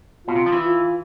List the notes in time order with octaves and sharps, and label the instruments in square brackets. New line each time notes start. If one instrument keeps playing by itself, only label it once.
[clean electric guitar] B2 [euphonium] F4
[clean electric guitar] C3
F3
E3
[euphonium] F4